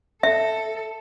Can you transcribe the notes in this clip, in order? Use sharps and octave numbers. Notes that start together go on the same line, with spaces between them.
A4 E5